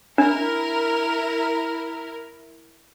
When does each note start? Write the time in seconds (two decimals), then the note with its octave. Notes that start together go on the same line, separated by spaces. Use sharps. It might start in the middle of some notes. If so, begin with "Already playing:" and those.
0.18 D4 E4 A#4